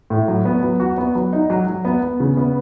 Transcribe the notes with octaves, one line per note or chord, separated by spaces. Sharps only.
A2
F#3
B3
F#3
F#4
B3
F#3
D#4
F#3
F#3
B3
B3
C#3
B3